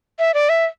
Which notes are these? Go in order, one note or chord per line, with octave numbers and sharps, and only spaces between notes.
E5
D5
E5